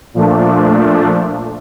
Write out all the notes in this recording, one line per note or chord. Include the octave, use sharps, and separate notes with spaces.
A#2 F3 A3 D4